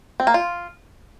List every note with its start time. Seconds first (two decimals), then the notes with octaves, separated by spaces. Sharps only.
0.20 C4
0.27 A#3
0.34 F4